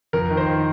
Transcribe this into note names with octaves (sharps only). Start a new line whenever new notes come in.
F2 A#4
D#3
C5
D#3